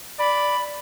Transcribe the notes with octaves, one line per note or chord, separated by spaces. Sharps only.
D5 B5